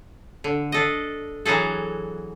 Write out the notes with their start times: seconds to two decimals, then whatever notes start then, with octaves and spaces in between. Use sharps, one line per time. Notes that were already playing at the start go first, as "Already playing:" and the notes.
0.44 D3
0.72 D4 A4 D#5
1.45 E3 F#3 F#4 G#4 A4